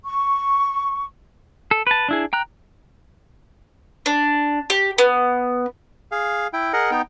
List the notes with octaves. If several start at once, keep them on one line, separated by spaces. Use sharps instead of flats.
C#6
A4
B4 A5
D4 E4 G#4
G5 A#5 F#6
D4
G4
B3
G#4 F5
E4 G5
G#4 A#4 D#5 F#5
B3 D#4 G5